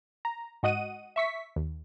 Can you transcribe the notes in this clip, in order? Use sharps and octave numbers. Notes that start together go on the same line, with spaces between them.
A#5
G#2 F#4 D#5 F#5 D#7
E5 C#6 B6
D#2